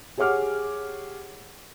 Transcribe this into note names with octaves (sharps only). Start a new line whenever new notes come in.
G4 G#4 C#5 F#5 D6 F6